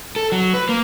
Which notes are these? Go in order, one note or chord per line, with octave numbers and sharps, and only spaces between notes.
A4
F#3
B4
A#3